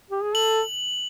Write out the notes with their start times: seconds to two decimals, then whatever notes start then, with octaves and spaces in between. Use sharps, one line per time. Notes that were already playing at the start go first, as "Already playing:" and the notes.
0.11 G4
0.23 G#4
0.35 A4 F#7